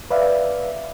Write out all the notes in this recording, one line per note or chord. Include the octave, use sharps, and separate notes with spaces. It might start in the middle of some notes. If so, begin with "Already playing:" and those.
B4 D5 E5 F5